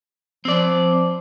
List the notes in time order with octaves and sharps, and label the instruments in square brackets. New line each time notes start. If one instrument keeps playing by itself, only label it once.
[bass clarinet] F3 [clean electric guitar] C4 D5